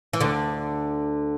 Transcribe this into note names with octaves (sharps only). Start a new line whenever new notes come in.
E3
D2 D3